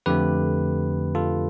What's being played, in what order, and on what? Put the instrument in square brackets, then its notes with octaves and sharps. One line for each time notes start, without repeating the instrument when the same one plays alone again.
[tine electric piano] F2 D3 A3 G4 B4
F4 A4